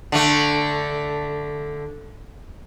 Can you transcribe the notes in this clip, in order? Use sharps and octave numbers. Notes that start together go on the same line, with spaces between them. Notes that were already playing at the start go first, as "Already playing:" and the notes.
D3 A3